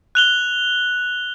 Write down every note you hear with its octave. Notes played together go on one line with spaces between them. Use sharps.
F#6 F7 G7